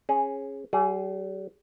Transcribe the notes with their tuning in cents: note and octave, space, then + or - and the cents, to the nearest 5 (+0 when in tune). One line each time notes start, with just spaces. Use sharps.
C#4 -20 G#4 +0
G3 -45 G#4 +15